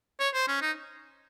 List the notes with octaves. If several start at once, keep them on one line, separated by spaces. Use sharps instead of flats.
C#5
C5
C#4
D#4